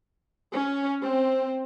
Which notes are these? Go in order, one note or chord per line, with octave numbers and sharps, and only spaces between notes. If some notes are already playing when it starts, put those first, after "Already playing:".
C#4
C4